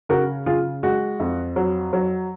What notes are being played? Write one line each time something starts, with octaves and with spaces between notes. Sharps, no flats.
C#3 F#4 A#4
C#3 F4 G#4
G#3 F#4
F2
F#3
F#3